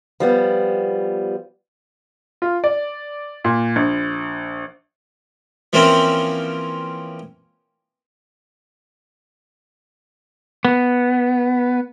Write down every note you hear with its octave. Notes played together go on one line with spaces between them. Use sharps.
F3 G3 B3
F4
D5
A#2
A#1
E3 F3 A#3 C4 C#4
B3